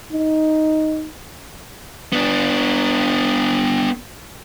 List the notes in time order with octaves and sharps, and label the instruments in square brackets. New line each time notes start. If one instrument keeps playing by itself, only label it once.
[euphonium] D#4
[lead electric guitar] B3 D4